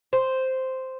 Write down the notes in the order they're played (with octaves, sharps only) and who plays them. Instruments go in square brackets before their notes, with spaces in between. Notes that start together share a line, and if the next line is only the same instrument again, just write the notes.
[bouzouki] C5